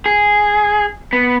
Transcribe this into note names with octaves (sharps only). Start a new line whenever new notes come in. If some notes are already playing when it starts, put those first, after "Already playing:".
G#4
B3